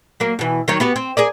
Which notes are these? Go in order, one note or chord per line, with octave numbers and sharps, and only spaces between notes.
F#3 A#3
B2 E3
D#3 F#3 C#5
B3 F#4 G4
C4
G#4 A#4 D5